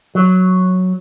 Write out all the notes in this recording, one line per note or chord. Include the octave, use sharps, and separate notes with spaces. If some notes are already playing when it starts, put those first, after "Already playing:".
F#3